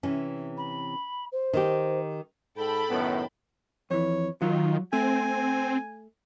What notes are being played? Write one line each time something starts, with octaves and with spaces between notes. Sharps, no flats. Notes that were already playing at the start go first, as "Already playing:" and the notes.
C3 E3 C#4
B5
C5
D#3 D#4 G4
G#2 A4 G5 A5 B5
F#2 A2 D#3 B3
F2 E3 C#5
D#3 F#3 F4
A3 C4 G#5